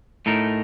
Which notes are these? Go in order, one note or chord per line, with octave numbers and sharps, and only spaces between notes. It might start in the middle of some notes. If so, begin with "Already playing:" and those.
A2 A3 D#4 A#4